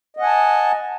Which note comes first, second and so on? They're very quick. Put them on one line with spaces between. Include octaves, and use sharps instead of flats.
D#5 F#5 G#5 A5